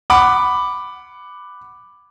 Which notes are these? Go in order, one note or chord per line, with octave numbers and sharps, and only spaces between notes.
F#5 B5 D6